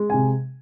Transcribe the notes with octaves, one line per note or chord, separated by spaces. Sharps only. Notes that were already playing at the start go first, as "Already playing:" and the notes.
Already playing: G#3
C3 G#5